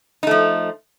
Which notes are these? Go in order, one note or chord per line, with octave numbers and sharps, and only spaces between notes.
F3 A3 D#4